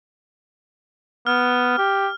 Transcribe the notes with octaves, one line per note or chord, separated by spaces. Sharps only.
B3 F6
G4